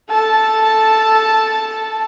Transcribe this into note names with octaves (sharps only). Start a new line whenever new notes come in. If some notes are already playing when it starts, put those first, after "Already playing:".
A4 A5